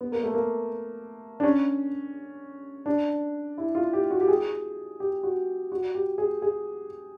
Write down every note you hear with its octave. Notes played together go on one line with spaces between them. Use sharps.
B3
A#3
A3
A#3
D4
C#4
D4
E4
F4
G4
F#4
G4
G#4
G4
F#4
F#4
G4
G#4
G#4